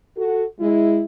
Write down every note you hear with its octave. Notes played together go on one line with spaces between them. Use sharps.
F#4 A4
G#3 E4